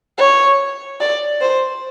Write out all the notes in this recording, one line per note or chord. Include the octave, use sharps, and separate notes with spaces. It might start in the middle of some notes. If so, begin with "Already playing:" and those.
C#5
D5
C5